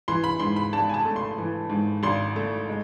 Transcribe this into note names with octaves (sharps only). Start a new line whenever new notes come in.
E3 C6
B5
G#2 C6
B5
G#1 A5
G#5
A5
A3
C6
E3
G#2
G#1 C6
A3
G#3